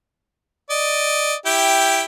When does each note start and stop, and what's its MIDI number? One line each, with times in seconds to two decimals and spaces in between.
0.70 1.34 74
0.70 1.34 75
1.46 2.04 64
1.46 2.04 67
1.46 2.04 79